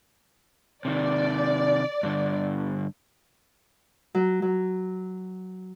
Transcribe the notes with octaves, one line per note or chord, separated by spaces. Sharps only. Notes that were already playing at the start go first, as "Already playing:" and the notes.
C3 D#3 D5
G2 D3
F#3
F#3